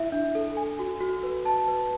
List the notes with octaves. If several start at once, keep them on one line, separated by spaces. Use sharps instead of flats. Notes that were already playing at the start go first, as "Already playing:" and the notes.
Already playing: E4 E5
D4
A4
G#5
F#4
F#4
B4
A5
B4